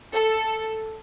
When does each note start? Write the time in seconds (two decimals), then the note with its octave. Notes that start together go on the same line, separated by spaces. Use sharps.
0.14 A4